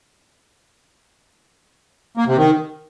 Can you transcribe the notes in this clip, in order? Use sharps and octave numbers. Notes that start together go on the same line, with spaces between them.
A#3
C3
D#3